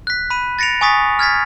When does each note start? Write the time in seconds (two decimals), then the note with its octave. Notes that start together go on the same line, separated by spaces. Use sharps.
0.07 F#6 B6
0.30 B5 D#7
0.59 A6 A#6 C#7 D7 F7
0.81 G#5 C#6 D#6 A6 B6
1.19 F6 G#6 A6 B6